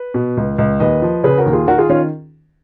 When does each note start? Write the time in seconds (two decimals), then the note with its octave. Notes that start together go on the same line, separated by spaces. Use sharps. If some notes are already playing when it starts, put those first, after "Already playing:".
Already playing: B4
0.14 B2
0.37 C#2
0.58 C#2
0.80 D#2 B4 D#5
1.02 F3
1.24 C#3 G#4 B4
1.38 F#4 A#4
1.46 D#2
1.53 F4 G#4
1.67 D#3 F#4 A#4
1.78 F4 G#4
1.89 D#3 C#4 F4